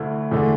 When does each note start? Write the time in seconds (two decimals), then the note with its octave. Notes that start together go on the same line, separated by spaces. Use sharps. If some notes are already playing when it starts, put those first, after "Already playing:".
Already playing: D2 D3 A3 E4
0.31 E2 D3 A3